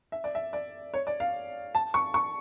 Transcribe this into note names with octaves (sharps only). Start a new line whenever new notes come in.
E5
D5
E5
D5
C#5
D5
F5
A5
C#6
C#6